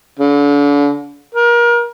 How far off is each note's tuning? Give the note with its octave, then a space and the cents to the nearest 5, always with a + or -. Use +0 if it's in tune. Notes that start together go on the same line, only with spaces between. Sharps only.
D3 -40
A#4 +30